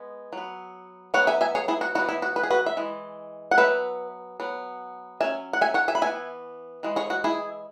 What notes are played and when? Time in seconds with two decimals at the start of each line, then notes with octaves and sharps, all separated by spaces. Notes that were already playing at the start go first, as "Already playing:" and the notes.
Already playing: G#3 B3
0.33 F#3 B3
1.14 F#3 B3 C#5 F#5
1.27 E5 G#5
1.41 E5 G#5
1.55 G#4 C#5
1.68 E4 G#4
1.81 F#4
1.95 E3 F#4
1.98 B3
2.09 E4
2.22 F#4
2.36 B4
2.43 G#4
2.50 F#4 B4
2.66 E5
2.77 E3 G#3
3.51 F#5
3.58 F#3 B3 B4 E5
4.40 F#3 B3
5.20 F#3 C#4 E5 G#5
5.53 F#5
5.61 E5 G#5
5.74 C#5 F#5
5.88 E5 G#5
5.95 B5
6.02 E3 B3 E5 G#5
6.83 E3 G#3
6.96 G#4 C#5
7.10 F#4
7.24 E4 G#4